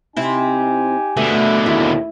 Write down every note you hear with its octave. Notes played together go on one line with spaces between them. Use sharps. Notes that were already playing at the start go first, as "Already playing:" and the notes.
C3 C4 D#4 E4 G4 G#5
B2 D3 A3
D#2 E4